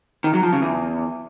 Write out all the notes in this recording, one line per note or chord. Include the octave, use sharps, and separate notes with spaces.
D#3
F#3
F3
C#3
E2